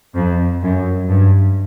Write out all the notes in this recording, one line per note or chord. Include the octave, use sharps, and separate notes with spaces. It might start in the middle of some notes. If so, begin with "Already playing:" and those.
F2
F#2
G2